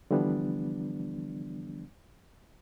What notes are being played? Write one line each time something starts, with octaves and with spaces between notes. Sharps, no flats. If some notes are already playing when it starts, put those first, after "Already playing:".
D3 E3 F3 G3 B3 D4